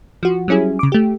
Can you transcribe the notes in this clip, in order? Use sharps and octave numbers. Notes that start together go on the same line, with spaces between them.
F3 F#4
F#3 G3 C#4 E4 G#4
C#3 D6
A3 G4